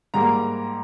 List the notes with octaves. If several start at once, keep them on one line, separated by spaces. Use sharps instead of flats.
G#2 G3 A#3 A#5